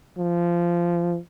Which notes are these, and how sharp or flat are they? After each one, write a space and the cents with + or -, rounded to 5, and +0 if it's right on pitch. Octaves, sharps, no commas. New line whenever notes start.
F3 -20